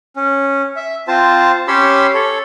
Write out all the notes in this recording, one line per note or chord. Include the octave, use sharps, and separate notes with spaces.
C#4
E5
C4 F4 C5 A5
C#4 G4 C#5 B5 C6 E6
A4 C#5